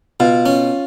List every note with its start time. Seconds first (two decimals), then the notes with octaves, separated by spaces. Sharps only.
0.20 B2 F4
0.46 C#4